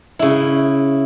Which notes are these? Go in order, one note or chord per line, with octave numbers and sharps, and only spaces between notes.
C#3 E4